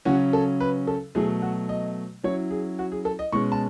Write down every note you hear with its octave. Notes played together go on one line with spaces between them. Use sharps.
C#3 F#3 C#4 F#4
A4
B4
A4
B2 F#3 A3 G#4
F#4
D#5
F#3 C#4 E4 C#5
G#4
F#4
G#4
A4
D#5
B2 G#3 C#4 C#6
A5